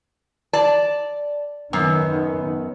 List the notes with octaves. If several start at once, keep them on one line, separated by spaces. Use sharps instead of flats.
D5 A5
F#2 D#3 B3